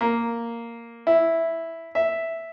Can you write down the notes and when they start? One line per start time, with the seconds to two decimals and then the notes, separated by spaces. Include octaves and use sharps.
0.01 A#3
1.07 E4
1.95 E5